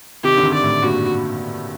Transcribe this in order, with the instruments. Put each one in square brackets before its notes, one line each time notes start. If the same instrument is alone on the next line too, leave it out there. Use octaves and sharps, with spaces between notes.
[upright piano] C3 D#3 [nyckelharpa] G4
[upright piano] D3
C3 D#3
[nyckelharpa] D5
[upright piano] A2
[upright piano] G2 A#2 [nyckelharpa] F#4